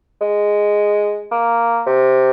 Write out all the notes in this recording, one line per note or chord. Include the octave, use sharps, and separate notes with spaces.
G#3
A#3
C3